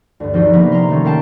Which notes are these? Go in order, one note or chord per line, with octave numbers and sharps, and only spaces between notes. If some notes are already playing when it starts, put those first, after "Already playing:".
D2 G2
F3 C4 D#4 F#4 G4
C3 F3 A#3 B3
A#5 C6
D#3 A3 C#4
G4 A#4 F5 G5 A5